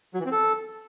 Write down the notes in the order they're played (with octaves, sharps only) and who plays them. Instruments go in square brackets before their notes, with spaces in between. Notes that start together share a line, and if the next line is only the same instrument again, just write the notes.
[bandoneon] F#3
E3
C4
A4